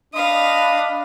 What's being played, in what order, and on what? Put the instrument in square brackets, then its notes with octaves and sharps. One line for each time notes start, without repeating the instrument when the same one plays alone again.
[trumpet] D4 [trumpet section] D#5 B5 [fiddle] F5 D#6